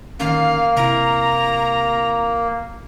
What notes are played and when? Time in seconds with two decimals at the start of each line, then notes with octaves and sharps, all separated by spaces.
0.20 D3 D#3 A#3 C#4 F5
0.76 C3 E4 A#5